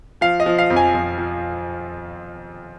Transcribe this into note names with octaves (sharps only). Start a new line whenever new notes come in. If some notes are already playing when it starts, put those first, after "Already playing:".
F3 F5
D#5
F3
F5
F2
G#5
F2
F3